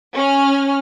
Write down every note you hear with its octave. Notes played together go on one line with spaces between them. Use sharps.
C#4 F6